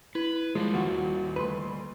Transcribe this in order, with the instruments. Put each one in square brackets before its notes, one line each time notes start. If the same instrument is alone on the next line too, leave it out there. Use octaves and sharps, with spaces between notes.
[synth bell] E4 [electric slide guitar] B4
[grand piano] F3 [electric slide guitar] G3 A#3 [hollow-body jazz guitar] G#3
[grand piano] D#1 [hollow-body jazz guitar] F4 F#4
[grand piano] D2 A3 C6 [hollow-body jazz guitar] B4